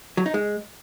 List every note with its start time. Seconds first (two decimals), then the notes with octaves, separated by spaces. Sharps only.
0.17 F#3
0.26 D#4
0.34 G#3